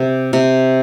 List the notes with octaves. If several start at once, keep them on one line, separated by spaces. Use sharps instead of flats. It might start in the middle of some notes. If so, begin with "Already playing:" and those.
Already playing: C3
C3